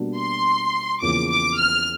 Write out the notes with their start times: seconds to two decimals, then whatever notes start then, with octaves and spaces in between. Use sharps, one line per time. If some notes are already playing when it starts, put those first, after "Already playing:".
Already playing: B2 G3 A#3 D4 F#4
0.17 C6
1.02 E2 C#3 F3 A#3 D6
1.30 D6
1.59 F6